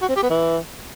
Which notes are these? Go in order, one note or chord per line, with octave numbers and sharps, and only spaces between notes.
F#4
C4
G4
B3
E3